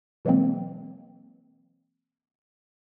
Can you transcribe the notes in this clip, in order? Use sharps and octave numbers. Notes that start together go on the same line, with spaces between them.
B2 E3 F#3 G#3 A#3 C4